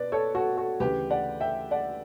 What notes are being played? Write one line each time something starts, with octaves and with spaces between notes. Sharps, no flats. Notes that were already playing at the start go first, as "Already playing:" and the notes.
Already playing: B2 B4 D5
A4 C#5
F#4 A4
F#4 A4
D2 C#3 E3 G4 B4
D5 F#5
E5 G5
D5 F#5